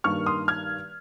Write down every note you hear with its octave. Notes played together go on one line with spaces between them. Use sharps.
G2 D#3 A#3 C#6 F6
C6 D#6
F6 G#6